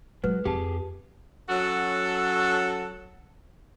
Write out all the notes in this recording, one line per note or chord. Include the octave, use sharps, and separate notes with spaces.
F#3 G#3 B4
F2 G4 G#4 G5 A5
F#3 C#4 F#4 A4